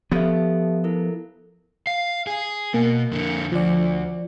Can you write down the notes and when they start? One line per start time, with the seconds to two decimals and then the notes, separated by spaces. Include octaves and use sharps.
0.12 F3 B3 G4 A4 E5
0.84 E4 A4 A#4
1.87 F5 C7
2.27 G#4
2.74 B2 A#3
3.11 F2 D3
3.52 D2 F3 D5